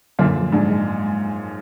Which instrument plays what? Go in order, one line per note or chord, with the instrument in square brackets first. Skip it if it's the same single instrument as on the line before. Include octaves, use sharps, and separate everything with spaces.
[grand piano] F#2 A#2 [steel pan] D3
[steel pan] F3
[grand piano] G#2 [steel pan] D4
[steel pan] G#3